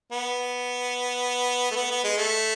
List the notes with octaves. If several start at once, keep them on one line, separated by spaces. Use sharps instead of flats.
B3
A3
B3
B3
G#3
A3